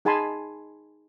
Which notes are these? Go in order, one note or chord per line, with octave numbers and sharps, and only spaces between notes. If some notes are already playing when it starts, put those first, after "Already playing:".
D#4 G#4 G#5 A5 B5 C6